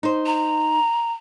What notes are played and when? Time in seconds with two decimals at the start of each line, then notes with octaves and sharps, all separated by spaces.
0.03 D#4 C5
0.26 A#5